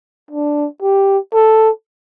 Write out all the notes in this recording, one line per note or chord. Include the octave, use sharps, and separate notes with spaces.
D4
G4
A4